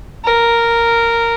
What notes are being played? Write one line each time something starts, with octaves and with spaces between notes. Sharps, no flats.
A#4